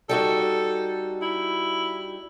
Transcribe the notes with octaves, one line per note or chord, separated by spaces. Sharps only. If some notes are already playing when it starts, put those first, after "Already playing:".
G3 D#4 F#4 A4
E4